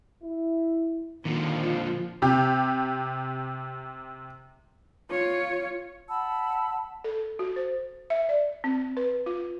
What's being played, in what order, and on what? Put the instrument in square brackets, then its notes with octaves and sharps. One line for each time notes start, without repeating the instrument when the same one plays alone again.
[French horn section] E4
[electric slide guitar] A#2 D3 [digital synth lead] D#3 [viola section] F3
[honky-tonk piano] C3 G4
[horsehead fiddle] F4 C#5
[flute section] F#5 A5 B5 E6
[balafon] A4
F#4
C5
E5
D5
C4
B4
F4